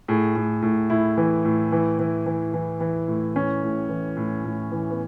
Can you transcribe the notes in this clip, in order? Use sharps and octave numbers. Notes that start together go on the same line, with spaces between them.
A2 G#4
A2
A2
A2 E4
E3
A2
E3
E3
E3
E3
E3
A2
E3 C#4
A2
E3
A2
A2
E3
B3